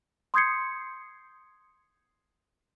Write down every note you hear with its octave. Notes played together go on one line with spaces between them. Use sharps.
C6 D#6 G6 G#6 C7 C#7